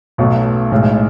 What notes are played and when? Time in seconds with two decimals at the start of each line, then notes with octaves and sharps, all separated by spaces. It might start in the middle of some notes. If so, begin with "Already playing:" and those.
0.18 B1 B2 F#3 A3
0.72 B1 A2 G#3